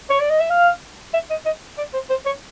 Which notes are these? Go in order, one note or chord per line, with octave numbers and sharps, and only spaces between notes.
C#5
D5
D#5
E5
F5
E5
D#5
D#5
D5
C5
C5
C#5